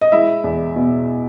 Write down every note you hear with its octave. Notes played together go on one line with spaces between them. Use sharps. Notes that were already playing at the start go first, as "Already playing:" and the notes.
D#5
G#3 E4 E5
E2
B2